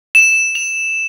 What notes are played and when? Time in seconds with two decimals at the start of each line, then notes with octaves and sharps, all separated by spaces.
0.15 E7
0.55 F7